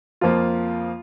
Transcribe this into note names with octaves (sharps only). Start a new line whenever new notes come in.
F2 F3 A#3 F4